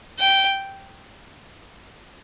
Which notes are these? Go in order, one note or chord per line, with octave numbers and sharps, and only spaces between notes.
G5